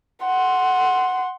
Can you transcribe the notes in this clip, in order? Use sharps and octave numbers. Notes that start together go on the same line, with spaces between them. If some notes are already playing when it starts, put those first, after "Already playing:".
F#5 C6